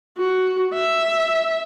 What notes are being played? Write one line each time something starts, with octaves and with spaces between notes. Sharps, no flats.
F#4
E5